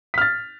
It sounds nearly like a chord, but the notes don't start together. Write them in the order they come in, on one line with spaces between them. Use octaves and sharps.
B6 F6 A6